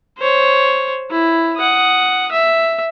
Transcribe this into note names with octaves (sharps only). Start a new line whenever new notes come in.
C5 C#5
E4
F#5 D#6
E5